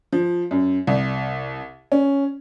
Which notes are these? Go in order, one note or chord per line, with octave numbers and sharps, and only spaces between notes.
F3
F#2
C2
C#4